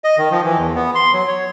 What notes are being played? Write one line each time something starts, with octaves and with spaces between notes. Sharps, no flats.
D#5
D#3
F3
E3
E2
B3
C6
F#3
C#5